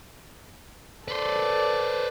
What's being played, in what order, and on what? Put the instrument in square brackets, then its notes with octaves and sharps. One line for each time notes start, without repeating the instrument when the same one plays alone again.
[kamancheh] A4 D5 [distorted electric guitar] B4 C5